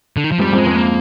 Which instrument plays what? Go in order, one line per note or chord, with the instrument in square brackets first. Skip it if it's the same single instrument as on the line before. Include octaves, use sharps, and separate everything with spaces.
[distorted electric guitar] D3
D#3
F3
[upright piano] F2 G#2 [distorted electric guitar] G3
[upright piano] F2 G#2
[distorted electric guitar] G#3
[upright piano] F2 G#2
[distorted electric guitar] A#3